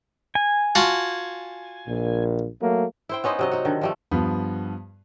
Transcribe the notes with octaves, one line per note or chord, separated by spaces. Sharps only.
G#5
F4 F#4 A5
A#1 A#2
F#3 A3 A#3
E4 C5 G5
B3 C#4 D#4 C5
C3 F#3 D#5
D#4 F#4
D3 D#3
F3 G3 A3
G2 F3 B3